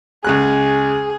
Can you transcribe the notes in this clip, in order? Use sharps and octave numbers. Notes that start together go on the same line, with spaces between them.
C#2 G#3 G#4 F#6